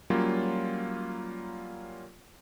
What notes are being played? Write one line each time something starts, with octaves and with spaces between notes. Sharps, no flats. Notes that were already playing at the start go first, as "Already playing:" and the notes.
F#3 G3 A#3 C#4 F4